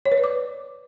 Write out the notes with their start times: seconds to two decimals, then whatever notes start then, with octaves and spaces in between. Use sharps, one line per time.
0.06 C#5
0.12 B4
0.18 D5
0.24 D6